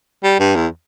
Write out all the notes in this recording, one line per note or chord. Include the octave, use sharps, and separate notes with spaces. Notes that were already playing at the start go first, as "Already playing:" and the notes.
G3
G2
E2